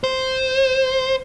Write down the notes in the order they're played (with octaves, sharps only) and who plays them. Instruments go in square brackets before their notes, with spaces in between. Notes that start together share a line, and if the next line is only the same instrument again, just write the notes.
[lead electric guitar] C5